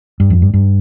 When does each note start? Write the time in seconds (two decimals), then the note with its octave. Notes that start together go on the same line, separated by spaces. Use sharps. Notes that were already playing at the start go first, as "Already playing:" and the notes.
0.20 G2
0.30 F2
0.42 G2
0.54 G2